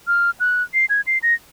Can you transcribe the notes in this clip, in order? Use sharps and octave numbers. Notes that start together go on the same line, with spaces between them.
F6
F#6
C7
G#6
C7
A#6